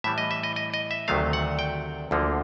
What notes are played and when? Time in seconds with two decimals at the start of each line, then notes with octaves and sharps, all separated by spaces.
0.04 A2 E3 G3 E5
0.18 D#5
0.31 E5
0.43 D#5
0.56 D#5
0.74 D#5
0.91 E5
1.08 D2 C3 D#3 F#3 A3 F5
1.33 F#5
1.59 G5
2.11 D2 D3 F3 A#3